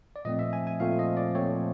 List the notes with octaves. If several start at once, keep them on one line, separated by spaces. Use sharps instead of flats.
D5
A#2 F3 A3 C4 D#5
E5
G#5
G#5
A#2 F3 A3 C4 F5
D#5
D5
A#2 F3 A3 C4 C#5